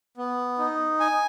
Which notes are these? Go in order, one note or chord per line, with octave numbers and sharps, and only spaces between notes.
B3
D#4
G#5